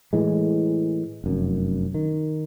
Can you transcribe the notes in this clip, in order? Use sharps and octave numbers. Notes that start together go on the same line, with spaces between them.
A2 E3 G#3
F1 F#2
D#3